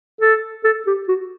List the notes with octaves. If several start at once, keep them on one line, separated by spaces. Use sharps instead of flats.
A4
A4
G4
F#4